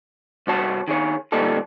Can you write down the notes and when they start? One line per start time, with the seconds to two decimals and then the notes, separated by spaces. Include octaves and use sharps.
0.47 C2 G2 F#4 C#5 A5
0.88 D#3 G#4 C#5
1.32 D2 A#2 G3 D#4 G4 A4